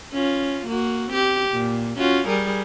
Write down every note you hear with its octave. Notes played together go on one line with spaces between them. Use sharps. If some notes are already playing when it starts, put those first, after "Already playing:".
C#4 F4
A#3 F#4
C4 G4
A#2
C#4 F4 F#4
G3 G#4 A#4